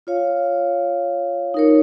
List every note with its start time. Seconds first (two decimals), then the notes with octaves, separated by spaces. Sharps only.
0.07 F4 C#5 F5
1.54 D#4 A#4 C#5